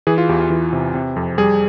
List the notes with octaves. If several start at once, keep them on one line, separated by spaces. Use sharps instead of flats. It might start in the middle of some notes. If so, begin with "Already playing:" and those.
E3 G#4
F4
E2 G4
F4
E3
C3
C3
F2
G3 G#4